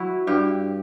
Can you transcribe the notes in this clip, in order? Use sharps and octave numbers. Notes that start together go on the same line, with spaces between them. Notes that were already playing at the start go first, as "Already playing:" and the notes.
Already playing: F#3 E4
G2 G4